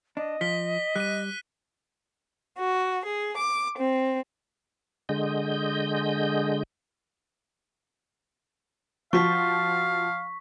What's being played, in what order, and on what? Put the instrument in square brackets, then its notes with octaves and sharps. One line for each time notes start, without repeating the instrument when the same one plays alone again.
[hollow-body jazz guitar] D4 [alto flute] D#5
[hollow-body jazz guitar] F3 [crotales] B6 G7
[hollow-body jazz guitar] G3 [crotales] F#6 B6 D#7
[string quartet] F#4
G#4
D6
C4
[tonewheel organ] D3 G#3 D#5 G6
[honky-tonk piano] F3 F#4 [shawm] F5 [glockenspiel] C#6 B6